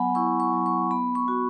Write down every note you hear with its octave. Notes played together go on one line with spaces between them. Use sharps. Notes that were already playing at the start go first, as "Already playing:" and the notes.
Already playing: F#3 B3 F#5 G#5 B5
E4 C#6
C#6
F#3
C#6
B3 B5
C#6
F#4